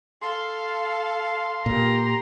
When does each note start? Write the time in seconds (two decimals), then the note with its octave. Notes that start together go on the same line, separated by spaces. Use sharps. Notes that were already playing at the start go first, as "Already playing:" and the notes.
0.22 A4 F5 C6
1.66 A#2 G4 A#5